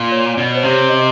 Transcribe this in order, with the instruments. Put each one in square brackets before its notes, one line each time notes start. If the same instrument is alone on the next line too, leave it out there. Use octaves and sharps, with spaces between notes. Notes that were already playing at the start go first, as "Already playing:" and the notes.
Already playing: [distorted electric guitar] A#2 [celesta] D5
[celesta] C#5
[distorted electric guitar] B2 [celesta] D5
[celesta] C#5
C5
[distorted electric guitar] C3
[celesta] C#5
D#5